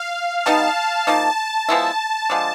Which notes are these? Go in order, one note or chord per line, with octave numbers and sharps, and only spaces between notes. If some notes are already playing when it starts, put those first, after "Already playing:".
Already playing: F5
G3 B3 D#4 A5
F3 A#3 D#4 A5
F3 G#3 B3 E4
D3 F3 G#3